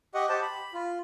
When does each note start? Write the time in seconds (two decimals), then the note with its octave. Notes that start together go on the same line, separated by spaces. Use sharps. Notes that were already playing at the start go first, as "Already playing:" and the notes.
0.14 G4 D#5 F#5 C#6
0.29 G4 C5 A5
0.42 B5
0.74 F4